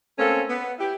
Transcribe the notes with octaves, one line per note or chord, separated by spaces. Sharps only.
A3 A#3 C4 C#4 A4
B3
E4 G4